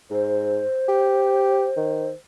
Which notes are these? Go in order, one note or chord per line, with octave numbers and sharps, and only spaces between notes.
G#2 C5
G4
D#3